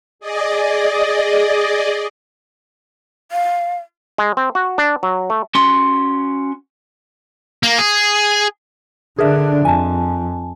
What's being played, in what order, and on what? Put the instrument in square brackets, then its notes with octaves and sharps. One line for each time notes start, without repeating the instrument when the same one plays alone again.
[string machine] G#4 D5 D#5
[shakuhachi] F5
[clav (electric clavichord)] G#3
C4
F#4
D4
F#3
A3
[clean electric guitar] C#4 F#4 C6
[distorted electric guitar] A#3
G#4
[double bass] D3 D4 [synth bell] G#4 A#4 E5
[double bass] F2 [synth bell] G#5 A5